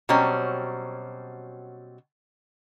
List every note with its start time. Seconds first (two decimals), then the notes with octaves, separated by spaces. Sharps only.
0.09 B2 F#3 G3 C4 C#4